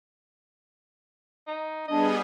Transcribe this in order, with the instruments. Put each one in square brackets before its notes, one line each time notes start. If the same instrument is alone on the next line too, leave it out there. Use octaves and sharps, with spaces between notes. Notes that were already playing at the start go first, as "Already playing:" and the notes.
[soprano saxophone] D#4
[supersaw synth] G3 B3 G#4 [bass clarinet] D4 [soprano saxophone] D#5